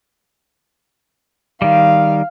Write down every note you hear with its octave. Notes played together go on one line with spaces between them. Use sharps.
D#3 G3 F5